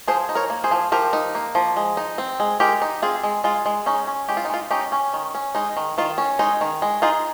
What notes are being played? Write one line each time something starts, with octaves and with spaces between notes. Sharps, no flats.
F3 G#4 C5
D#4
A#4 C#5
A#3
G#4 C5
F3
F3 G4 A#4
D#4
A#3
F3
G#3
D#4
C4
G#3
G#3 G4 A#4
D#4
C4 F4 G#4
G#3
G#3 F4
G#3
C#4 D#4
C#4
G#3 G4
F4
D#4
G#3 F4
C#4 D#4 G4
C#4
D#3
C#4
G#3 D#4
D#3
D#3 F4
C#4
G#3 D#4
D#3
G#3
D#4 F4 G#4